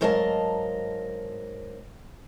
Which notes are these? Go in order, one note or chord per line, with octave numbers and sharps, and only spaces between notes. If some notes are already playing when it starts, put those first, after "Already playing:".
G#2 F#3 A#4 D#5 F5 A5